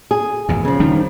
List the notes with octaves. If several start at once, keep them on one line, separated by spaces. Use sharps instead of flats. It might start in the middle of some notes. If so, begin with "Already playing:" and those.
G#4
G#1 E2 A#2
C#3 F3
D#3 G3 D4